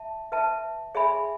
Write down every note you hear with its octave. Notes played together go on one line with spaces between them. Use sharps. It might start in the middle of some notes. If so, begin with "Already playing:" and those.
Already playing: E5 A5
B4 E5 A5
G#4 C#5 E5 G#5 B5